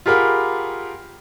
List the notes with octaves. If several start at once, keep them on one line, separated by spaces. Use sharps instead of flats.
F4 G4 G#4 A#4 F#5 B5